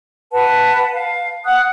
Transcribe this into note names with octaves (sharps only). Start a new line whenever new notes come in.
B4 F#5 A5
F5
F#5 D#6 F#6